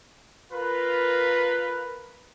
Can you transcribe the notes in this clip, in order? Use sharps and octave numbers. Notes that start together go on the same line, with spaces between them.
F4 A#4 B4